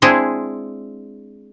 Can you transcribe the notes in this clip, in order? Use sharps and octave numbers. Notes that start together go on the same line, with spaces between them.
G#3 C4 D4 E4 G#4